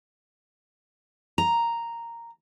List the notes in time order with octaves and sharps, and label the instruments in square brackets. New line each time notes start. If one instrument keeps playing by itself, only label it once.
[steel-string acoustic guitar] A#5